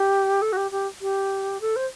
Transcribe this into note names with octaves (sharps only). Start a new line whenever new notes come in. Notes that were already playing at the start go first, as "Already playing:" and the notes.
Already playing: G4
A4
F#4
G4
G4
G4
A4
C5